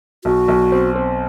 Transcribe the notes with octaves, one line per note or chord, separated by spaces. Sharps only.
B1 F#4
B1
C4
C4